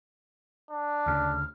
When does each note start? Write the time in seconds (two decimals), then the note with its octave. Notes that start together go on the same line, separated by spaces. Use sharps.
0.70 D4
1.06 D2 C#3 F6